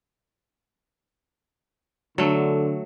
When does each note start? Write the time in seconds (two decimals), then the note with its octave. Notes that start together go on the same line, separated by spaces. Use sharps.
2.18 D3 F#3 A3